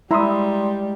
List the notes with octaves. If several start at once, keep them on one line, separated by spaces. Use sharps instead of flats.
G3 G#3 E4 E5 A#5 C6 D#6